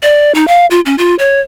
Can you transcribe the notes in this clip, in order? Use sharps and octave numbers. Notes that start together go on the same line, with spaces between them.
D5
D#4
F5
F4
C#4
F4
C#5